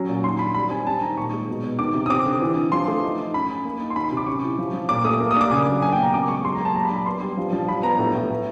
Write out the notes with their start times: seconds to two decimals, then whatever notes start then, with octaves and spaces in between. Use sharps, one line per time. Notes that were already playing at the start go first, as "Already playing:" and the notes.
Already playing: F#3 C#4
0.09 A#2
0.24 D#3 C6
0.39 D4 B5
0.54 G3 B5
0.70 C4 G#5
0.86 C4 A5
1.02 D#3 A#5
1.17 A#2 C#6
1.32 G#3
1.48 B2
1.64 B2
1.79 D#3 D6
1.94 C3
2.06 D#6
2.10 C4 D6
2.26 D3
2.41 E3
2.57 E3
2.72 F3 C6
2.88 A3
3.03 D#4
3.19 D#4
3.34 C#4 B5
3.50 C#4
3.65 A#3
3.81 D#4
3.90 C6
3.96 D#3 B5
4.12 C3
4.17 D6
4.27 C#4 C#6
4.43 E4
4.58 F3
4.74 F3
4.89 A#2 D6
5.04 A3 D#6
5.20 A#3
5.31 D#6
5.36 D4 D6
5.51 C#3 G#5
5.67 F#3
5.82 A#3 G#5
5.93 G5
5.98 B2 A#5
6.14 C#3 D6
6.28 G#3 C#6
6.44 F#3 C6
6.55 A#5
6.60 A#3
6.65 A5
6.75 F#3 A#5
6.85 B5
6.90 D4
6.96 B5
7.06 B3 C6
7.21 G3
7.37 F3
7.53 F3
7.68 D4 B5
7.83 B3 A#5
7.99 A2
8.15 A2
8.30 A2